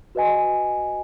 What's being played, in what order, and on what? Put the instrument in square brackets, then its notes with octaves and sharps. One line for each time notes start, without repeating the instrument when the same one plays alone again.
[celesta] F#4 B4 D#5 G#5